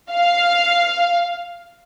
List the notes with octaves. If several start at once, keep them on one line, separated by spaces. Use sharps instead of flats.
F5